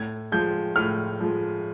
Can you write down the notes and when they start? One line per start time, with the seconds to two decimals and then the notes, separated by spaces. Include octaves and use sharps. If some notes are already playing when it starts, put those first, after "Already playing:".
Already playing: A2 G#6
0.32 F3 G#3 G6
0.76 A2 F6
1.20 F3 G#3